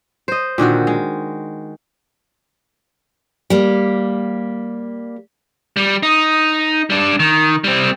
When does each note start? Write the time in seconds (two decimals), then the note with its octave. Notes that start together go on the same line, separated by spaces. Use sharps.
0.28 C5 D#5
0.58 A#2 D3 D#3 F#4
0.87 G#3
3.50 G3 A#3
5.77 G3
6.03 D#4
6.90 G3 D4
7.20 D#3
7.64 G3 C4